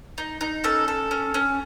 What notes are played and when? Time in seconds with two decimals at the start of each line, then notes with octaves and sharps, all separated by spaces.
0.18 D#4
0.41 D#4
0.64 C#4 A4
0.88 A4
1.11 C#4
1.34 C#4